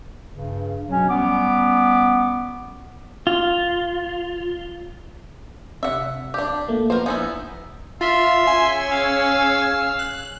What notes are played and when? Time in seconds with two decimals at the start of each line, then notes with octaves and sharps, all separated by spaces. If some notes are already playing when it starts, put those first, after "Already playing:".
0.34 G2 C#3
0.89 C#2 B2 F#3 C#4
1.09 G3 B3 C#4 D6
3.27 F4
5.83 C3 E5 F#5
6.34 D4 G4
6.68 A#2 A3 A#3
6.90 F3 B3 A#4 C5
7.06 B3 D#4 E4 G#5
8.01 F4 E5 C6
8.47 C#4 G#4 G#5 E6
8.91 F5
9.99 F#6